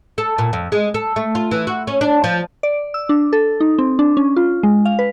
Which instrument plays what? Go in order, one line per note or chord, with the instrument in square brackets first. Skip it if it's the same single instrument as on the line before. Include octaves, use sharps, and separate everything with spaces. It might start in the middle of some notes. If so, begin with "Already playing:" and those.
[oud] A4
A#2
F2
G#3
A4
A3
F4
E3
F#4
C#4
D4
F3
[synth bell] D5
E6
D4
A4
D#4
C4
D4
C#4
F4
G#3
F5
B4